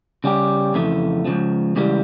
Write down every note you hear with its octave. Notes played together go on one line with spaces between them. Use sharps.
C#3 G3 C#4 G4
F2 C#3 E3 A3
C#2 C#3 F3
C#2 C#3 E3 G3